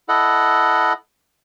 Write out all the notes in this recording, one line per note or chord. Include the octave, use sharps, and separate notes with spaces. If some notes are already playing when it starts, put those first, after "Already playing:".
E4 A4 D#5 F#5